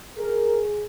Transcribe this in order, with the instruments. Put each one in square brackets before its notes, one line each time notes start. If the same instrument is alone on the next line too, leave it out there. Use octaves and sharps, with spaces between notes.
[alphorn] G#4 [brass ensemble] A#4